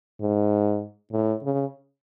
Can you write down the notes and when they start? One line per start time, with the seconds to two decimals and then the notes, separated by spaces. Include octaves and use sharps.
0.21 G#2
1.12 A2
1.43 C#3